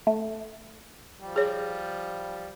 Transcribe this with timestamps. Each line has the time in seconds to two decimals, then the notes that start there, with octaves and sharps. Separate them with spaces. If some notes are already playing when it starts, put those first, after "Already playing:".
0.07 A3
1.20 F3 G3
1.36 G#4 C#5